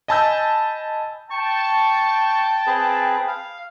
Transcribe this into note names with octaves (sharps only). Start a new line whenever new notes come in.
D#5 G#5 A5 B5 E6 G6
G5 A5 C#6
C4 G#4 B4
F5